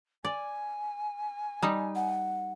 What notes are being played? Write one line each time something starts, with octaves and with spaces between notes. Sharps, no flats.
D5 G#5
G3 D#4
F#5